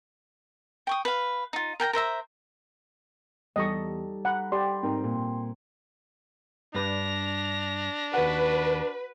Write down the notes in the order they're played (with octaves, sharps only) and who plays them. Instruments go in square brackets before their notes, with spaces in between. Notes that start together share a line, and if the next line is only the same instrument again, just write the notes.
[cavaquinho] G5 C#6 D#6
B4 F5
D#4 F4
A#4 G5 G#5 A#5
A#4 C5 E5 A#5
[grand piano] E2 [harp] G3 D#4 A4 [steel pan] D#5 C#6
[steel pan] F#5 [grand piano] A#5 B5
[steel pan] G4 D5 [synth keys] G5 C6
[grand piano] G#2 A#4 A#5 [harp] C4 D#4
[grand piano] A#2
[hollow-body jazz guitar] G2 B4 D5 [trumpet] D4 [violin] A#6 F7
[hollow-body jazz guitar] D#2 F#5 [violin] F#4 [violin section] B4